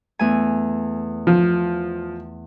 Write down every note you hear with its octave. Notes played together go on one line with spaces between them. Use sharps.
E2 A3 G#5
F3